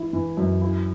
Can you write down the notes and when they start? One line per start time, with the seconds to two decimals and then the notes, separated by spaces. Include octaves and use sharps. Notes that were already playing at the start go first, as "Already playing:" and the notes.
Already playing: E3 E4
0.13 E3
0.37 F#2
0.62 E4